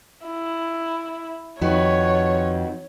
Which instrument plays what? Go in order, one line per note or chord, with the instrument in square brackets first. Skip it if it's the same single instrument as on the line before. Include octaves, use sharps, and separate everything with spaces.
[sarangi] E4
[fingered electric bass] F2 [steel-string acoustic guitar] D#3 F#4 B4 [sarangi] C#5